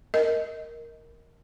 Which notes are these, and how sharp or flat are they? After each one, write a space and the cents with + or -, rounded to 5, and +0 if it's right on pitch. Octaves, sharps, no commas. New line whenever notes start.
A#4 +0 D#5 +25